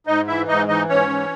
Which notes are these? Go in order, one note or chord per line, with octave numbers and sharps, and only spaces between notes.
G#2 D#4 D#5
E3 E4 E5
G#2 D#4 D#5
E3 D#4 D#5
G#2 C#4 C#5
E3